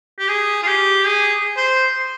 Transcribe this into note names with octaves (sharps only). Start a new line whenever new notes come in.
G4
G#4
F4
G4
G#4
C5